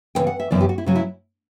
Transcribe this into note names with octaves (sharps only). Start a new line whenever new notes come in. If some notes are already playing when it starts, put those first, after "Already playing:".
F#2 C#3 E3 B3 G5
F#5
E5
F#2 C#3 E3 B3 D5
G4
F#4
E4
C#3 F#3 C#4 F#4
E4